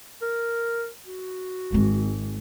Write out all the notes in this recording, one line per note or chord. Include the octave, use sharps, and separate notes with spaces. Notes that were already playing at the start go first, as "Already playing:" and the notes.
A#4
F#4
G#1 G#3 C4